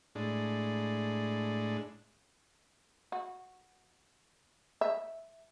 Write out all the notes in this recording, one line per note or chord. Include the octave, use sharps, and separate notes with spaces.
A2 G#3 D4
F#4
E5